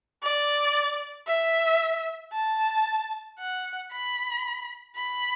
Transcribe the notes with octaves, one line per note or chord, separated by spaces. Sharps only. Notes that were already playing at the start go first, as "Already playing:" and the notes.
D5
E5
A5
F#5
B5
B5